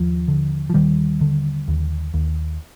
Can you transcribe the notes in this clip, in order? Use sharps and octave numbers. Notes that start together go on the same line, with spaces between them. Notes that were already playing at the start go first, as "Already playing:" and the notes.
Already playing: D#2 F3
D3
F3
D#2 D#3 G3
D3
D#2
D#2